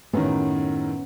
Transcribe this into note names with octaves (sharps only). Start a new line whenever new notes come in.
F#2 A2 D#3 B3 C#4